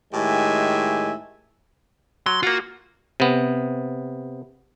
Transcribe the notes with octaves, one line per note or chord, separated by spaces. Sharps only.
A2 D#3 G#3 G4 E5 G#5
F#3 C6
A#3 F4 F#4
C3 B3